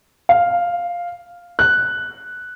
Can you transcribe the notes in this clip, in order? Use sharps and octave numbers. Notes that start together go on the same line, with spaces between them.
F5
F#6